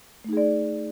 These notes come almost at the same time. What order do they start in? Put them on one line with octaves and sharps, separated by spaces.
A3 D#4 G#4 D5